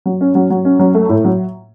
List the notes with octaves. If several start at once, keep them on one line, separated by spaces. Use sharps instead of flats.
F#3
C#4
F#3
F#3
C#4
F#3
A3
A2
F#3